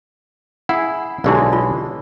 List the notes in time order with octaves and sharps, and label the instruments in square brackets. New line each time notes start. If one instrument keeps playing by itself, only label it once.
[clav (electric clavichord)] E4 G#4 [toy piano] F#5
[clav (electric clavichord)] B1 D3 G#3 [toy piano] E4 G4 D5
[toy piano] F4